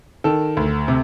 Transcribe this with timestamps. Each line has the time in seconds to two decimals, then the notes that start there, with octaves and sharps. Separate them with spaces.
0.24 D#3 A4
0.57 D2
0.88 C3